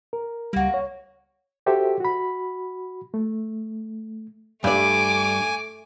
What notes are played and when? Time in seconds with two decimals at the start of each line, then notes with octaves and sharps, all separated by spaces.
0.13 A#4
0.53 C#2 G3 A#3 F#4
0.74 C#5
1.66 F#4 G4 A4 C5 E5
2.00 F#4 B5
3.14 A3
4.64 G2 A3 D5 G#5 D6